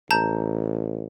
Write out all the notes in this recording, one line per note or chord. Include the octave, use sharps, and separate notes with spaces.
A1 A5 A#5 G6